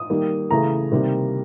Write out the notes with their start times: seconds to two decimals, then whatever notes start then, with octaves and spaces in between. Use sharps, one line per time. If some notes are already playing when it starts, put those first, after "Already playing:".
Already playing: D#6
0.10 D#3 G3 A#3
0.51 C#3 E3 A3 A#5
0.92 C3 D#3 G3 A#3